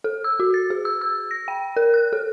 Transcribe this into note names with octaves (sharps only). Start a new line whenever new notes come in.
A4
E6
F#4
A6
G#4
E6
E6
A#6
G5
A#4
F#6
A4